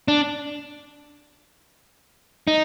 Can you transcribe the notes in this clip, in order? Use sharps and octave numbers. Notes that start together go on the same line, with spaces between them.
D4
D#4